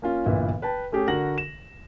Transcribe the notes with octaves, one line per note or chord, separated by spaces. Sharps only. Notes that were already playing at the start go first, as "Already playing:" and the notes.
A#3 C#4 F4
G1 A#2 D3 E3 E4 E5
B4 G5 A5
A3 C#4 G4 G#4
D3 F#4 A#4 A#6 F#7
E7